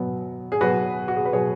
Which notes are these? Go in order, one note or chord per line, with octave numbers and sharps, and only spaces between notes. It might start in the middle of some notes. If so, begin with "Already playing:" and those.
Already playing: B2 F#3 B3
G#4
B2 F#3 B3 F#4 B4
F#4
G#4
B4
B2 F#3 B3 G#4 C#5